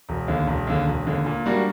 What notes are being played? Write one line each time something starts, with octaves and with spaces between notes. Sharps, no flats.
E1
D#2 D3
E1
D#2 D3
E1
D#2 D3
A#2
G3 A#3 D4 F#4